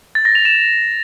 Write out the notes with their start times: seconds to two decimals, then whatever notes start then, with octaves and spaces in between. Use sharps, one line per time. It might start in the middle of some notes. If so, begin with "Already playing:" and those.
0.15 A6
0.25 A#6
0.35 F7
0.45 E7